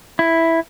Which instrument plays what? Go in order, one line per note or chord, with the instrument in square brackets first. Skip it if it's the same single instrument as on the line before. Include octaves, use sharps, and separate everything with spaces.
[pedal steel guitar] E4